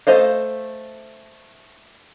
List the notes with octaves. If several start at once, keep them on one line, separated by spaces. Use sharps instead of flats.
A3 C5 D#5 F5